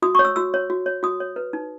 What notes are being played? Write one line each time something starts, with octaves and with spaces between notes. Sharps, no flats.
F#4 D#6
C#5 C#6
E6
F#4 E6
C#5
F#4
C#5
F#4 D#6
C#5
B4
D#4